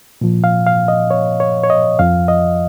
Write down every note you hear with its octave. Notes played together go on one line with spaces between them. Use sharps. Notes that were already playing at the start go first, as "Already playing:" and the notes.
A#2 F3
F5
F5
D#5
C#5
C#5
C#5
D#5
F2 F3 F5
D#5